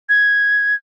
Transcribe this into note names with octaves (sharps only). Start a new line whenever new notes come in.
G#6